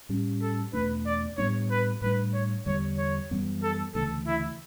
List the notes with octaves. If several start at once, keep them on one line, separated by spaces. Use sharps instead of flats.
A2 G3 C#4
A4
E2 B2 A3 D4 B4
D5
A2 G3 B3 D4 C#5
B4
A2 G3 D4 B4
C#5
E2 D3 G3 C#5
C#5
F#2 E3 G3 B3
A4
D2 C#3 E3 A4
E4